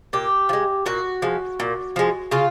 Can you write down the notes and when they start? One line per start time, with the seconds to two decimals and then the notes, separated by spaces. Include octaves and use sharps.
0.13 A#2 G4
0.49 F3
0.53 G#3
0.86 A#2 F#4
1.22 F3 G#3
1.60 A#2
1.96 F3 G#3
2.31 C#3 F4